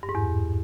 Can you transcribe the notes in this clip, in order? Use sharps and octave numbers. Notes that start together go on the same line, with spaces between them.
G2
G#2
E2